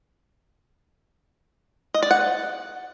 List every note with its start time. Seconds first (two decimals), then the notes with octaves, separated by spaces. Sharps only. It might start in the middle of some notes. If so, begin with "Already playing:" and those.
1.94 D#5
2.03 D5
2.11 F#5